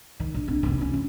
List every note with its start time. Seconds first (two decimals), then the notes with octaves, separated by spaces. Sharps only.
0.20 D#3
0.34 A#1
0.48 C4 D4
0.63 F1 B3
0.78 C#4 F4
0.94 C#4